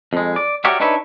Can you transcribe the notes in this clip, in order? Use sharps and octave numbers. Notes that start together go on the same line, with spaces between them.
F2 G#3
D5
F#4 G4 A#4 C#5 D5 E5
D4 D#4 B4 C#5 E5